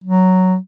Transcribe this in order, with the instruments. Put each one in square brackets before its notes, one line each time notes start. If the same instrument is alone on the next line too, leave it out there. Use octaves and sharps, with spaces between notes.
[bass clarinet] F#3